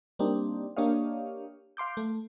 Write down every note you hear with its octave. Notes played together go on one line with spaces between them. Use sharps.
G3 A#3 C4 D4 D#4 G4
A#3 D4 G4 C#5 D#5 F5
F5 C6 D6 G6
A3